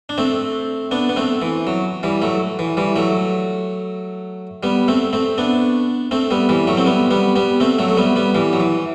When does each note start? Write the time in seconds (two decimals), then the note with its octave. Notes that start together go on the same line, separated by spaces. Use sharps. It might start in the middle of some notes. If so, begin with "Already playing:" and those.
0.09 D4
0.18 A3 C4
0.91 B3 D4
1.09 B3
1.17 A3 C4
1.42 E3
1.67 F#3
2.03 E3 G3
2.22 F#3 A3
2.59 E3
2.77 E3 G3
2.96 F#3 A3
4.63 G3 B3
4.88 A3 C4
5.13 A3 C4
5.38 B3 D4
6.11 A3 C4
6.31 G3 B3
6.49 E3 G3
6.68 F#3 A3
6.77 C4
6.86 G3 B3
7.11 G3 B3
7.36 G3 B3
7.60 A3 C4
7.78 F#3 A3
7.88 A3
7.97 G3 B3
8.16 G3 B3
8.35 E3 G3
8.53 F#3
8.60 E3